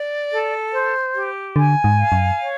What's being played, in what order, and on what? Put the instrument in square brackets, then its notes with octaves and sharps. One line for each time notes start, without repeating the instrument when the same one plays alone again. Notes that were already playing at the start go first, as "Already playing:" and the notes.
Already playing: [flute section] D5
A4
C5
G4
[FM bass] D3 [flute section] G#5
[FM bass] G#2
[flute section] F5
[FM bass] F#2
[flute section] C#5